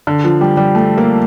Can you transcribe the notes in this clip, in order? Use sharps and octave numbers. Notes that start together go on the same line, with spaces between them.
D3
F3
G3
G3
A3
A#3